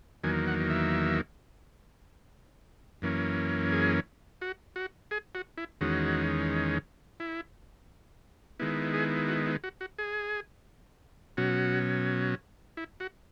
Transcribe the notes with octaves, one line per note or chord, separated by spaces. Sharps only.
E2 D#3 F#3 A#3 G#5
F#5
E5
F#2 E3 A#3 C#4
G#4
F#4
F#4
G#4
F#4
E4
E2 D#3 G#3 C#4 F#4
E4
D#3 G#3 B3 E4
G#4
F#4
E4
F#4
F#4
G#4
B2 F#3 C#4 F#4
E4
F#4